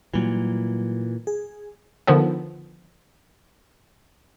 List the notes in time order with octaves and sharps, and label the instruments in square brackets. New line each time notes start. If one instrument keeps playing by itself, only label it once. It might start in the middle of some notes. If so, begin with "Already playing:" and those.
[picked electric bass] A#2 E3 [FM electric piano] F#3 G3
[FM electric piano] G#4
[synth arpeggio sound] D3 D#3 F3 B3